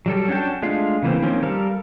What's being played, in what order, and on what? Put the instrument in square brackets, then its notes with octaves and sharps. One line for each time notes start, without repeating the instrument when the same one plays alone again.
[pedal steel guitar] F#3 G3 A4
C#4 D4 F#4 G5 A5
G#3 A3 D4 F4 F5
C#3 E3 A#3 C4
D#3 F3 A#3 C4 C#4
G3 A4 A#4 F5